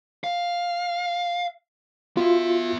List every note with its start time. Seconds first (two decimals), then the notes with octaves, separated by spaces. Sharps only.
0.24 F5
2.17 B3 F4 F#4 E5